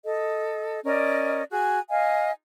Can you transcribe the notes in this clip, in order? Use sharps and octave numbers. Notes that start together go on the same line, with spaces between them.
A4 D#5
C#4 A#4 D5 D#5
F#4 G#4 G#5
D#5 F5 G#5